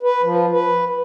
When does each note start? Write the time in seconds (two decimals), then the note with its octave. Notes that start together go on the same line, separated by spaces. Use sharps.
0.03 B4
0.23 F3
0.52 B4